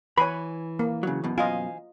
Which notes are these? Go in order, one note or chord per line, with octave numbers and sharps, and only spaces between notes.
E3 B4 C#5 G#5 B5
A#3
C#3 F#3
F#2 B2
F4 C5 D#5 F5 G#5